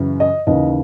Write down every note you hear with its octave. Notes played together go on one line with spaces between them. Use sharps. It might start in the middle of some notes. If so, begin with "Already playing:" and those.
Already playing: F#2 C#3 E3
D#5
D#2 C#3 E3 D#5